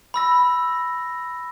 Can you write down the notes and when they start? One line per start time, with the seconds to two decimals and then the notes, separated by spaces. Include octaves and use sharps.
0.14 B5 E6 A#6